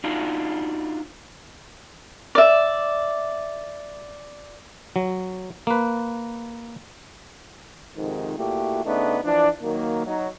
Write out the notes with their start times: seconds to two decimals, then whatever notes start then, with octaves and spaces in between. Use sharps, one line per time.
0.04 D4 D#4 F4 F#4
2.35 D5 E5
4.96 F#3
5.67 A#3 B4
7.96 F2 G#2 C3 D#3
8.37 A#2 A3 E4 F#4 G4
8.85 C#3 A3 B3 D4 D#4
9.24 E3 F3 D4
9.62 D#3 F#3 A#3
10.06 F#3 D#4